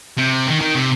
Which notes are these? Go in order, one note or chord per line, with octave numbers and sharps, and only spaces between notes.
C3
D#3
D#3
C3